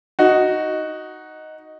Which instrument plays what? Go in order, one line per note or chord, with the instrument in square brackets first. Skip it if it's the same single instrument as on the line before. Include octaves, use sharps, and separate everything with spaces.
[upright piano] D#4 F#4